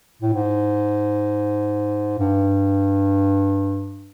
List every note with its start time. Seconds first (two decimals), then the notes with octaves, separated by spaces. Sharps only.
0.22 A2
0.33 G#2
2.19 G2